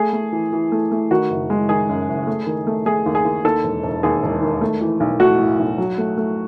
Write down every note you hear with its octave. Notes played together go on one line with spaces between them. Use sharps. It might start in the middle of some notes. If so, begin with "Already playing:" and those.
Already playing: A3 G#4
A3
E3
E3
A3
A3
D#3 F#4
F#1
G#3
D#3 G#4
F#2
F#1
A3
D#3
A3
A3 G#4
D#2
G#4
D#2
D#2 A4
E1
E1
D#2 G#4
E1
D#3
A3
E3
B1
A3 F#4
A2
B1
F#3
A3
A3